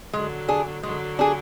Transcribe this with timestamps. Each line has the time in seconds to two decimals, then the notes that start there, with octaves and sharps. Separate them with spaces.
0.13 D3 F#3 G#3
0.49 D4 G#4
0.83 D3 F#3 G#3
1.19 D4 G#4